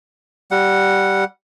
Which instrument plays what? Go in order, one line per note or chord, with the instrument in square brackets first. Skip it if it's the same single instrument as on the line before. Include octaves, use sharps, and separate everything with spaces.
[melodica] G3 F#5